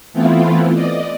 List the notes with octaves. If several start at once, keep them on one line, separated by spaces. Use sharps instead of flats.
E3 A3 B3 C4 E4 F4
D5 D#5